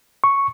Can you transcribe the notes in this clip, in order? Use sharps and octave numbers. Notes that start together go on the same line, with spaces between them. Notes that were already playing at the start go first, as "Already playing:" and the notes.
C#6